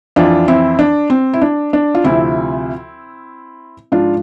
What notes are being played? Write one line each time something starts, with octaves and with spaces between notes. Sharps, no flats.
F2 E3 D4 F4
C4 E4
D4
C4
E4
D4
D4
F4
D2 C3 F3 C4 E4
G#2 F3 D4 F4